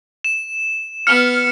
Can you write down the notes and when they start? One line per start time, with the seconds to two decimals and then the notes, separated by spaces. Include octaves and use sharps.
0.24 E7
1.07 B3 F6 C#7